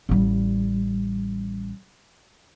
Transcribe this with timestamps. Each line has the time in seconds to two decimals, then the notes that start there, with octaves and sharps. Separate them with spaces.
0.09 A1 G3